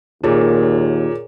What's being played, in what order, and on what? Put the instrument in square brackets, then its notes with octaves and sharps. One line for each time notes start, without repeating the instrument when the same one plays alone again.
[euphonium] D#2 [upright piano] A#2 [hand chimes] G#4 A#4 C#5